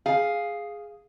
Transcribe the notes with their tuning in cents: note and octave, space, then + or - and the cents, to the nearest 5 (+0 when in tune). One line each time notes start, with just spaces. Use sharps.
G#4 +0 F5 +0